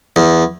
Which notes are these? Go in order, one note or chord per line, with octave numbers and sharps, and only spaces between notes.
E2